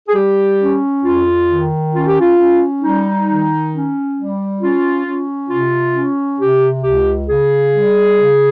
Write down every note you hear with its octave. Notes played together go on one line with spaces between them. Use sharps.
G#4
G3 G4
C#4
F2 F4
D#3
C#4 F4
G4
F4
C#4
G3 D#4
D#3
C#4
G3
C#4 F4
C#4
C3 F4
C#4
C3 G4
C#2 G4
C#3 G#4
G3
C#3